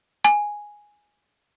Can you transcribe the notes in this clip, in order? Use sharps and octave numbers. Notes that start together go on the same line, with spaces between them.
G#5